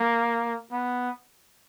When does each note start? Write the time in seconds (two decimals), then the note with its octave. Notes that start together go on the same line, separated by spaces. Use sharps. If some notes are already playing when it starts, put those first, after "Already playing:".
Already playing: A#3
0.72 B3